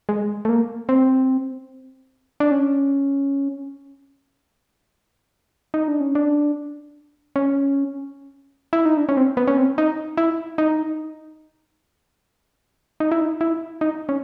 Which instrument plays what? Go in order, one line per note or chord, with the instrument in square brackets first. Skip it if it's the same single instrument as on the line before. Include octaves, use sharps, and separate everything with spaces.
[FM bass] G#3
A3
A#3
C4
D4
C#4
D#4
D4
C#4
D4
C#4
E4
D#4
D4
C#4
C4
B3
C#4
C4
D#4
E4
D#4
D#4
E4
D#4
E4
D#4
C#4